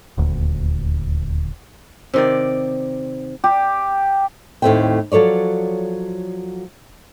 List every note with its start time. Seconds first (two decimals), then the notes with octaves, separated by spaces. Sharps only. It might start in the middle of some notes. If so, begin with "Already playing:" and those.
0.18 D#1 D2
2.14 C3 D#3 D5
3.44 G4
4.62 D#2 A2 C3 A3 C4 G5
5.12 F3 F#3 A4 C#5 D5